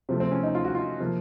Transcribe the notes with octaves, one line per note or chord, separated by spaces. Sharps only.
C3 F3 A3 C4
C4
C#4
D#4
F4
F#4
F4
C3 F3 A#3